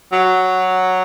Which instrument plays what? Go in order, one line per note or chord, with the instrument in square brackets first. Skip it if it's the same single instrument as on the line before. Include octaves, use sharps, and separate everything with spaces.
[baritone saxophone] F#3